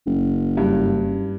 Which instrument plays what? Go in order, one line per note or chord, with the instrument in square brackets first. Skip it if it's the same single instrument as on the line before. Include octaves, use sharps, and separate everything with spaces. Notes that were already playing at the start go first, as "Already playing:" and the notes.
[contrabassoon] F#1
[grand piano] G2